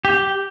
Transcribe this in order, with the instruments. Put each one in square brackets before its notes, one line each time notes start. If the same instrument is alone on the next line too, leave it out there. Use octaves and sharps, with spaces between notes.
[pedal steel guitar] G4